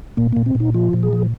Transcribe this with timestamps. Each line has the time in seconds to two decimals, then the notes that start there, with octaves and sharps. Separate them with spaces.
0.17 A#2 A#3
0.33 A#2 A#3
0.46 C4
0.55 A#2
0.60 D#4
0.74 F3 F4
0.93 A#2
1.03 G#4
1.13 F3